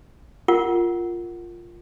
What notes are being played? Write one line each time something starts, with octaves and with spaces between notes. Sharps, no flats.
F4 A#4 F#5